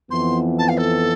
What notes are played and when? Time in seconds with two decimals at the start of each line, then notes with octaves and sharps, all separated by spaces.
0.10 F2 E3 B3 C6
0.58 A5
0.68 F5
0.78 A4